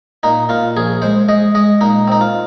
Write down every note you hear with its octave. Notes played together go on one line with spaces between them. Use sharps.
A#2 D#4
A#2 F4
A#1 G#4
G#3 C5
G#3 D#5
G#3 D#5
A#2 D#4
C4 D#4
F4